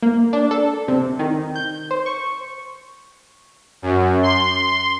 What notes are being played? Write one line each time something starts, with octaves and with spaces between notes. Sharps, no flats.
A#3
D4
A4
C3
D#3
G6
C5
C#6
F#2
C6